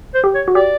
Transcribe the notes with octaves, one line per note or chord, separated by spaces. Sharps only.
C5
G4
C#5
F#4
G4 D5